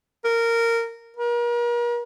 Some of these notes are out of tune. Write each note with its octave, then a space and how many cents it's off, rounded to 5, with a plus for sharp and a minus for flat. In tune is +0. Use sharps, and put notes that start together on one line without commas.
A#4 -15
A#4 +40